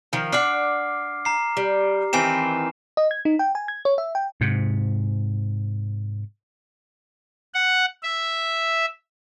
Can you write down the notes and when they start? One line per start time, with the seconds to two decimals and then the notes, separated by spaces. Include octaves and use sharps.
0.13 D#3 F3
0.33 D4 F#5 D6 F6 C7
1.25 A#5 C7
1.57 G3
2.13 D#3 E3 C4 G#5 C7 E7
2.97 D#5
3.11 G#6
3.25 D#4
3.39 G5
3.55 G#5
3.68 G#6
3.85 C#5
3.98 E5
4.15 G5
4.41 G#2 C3
7.54 F#5
8.03 E5